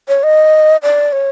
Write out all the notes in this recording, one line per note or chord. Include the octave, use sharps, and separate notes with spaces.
C#5
D#5
D5
C#5